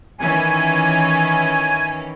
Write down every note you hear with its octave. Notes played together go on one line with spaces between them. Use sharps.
D#3 E3 C#4 G#5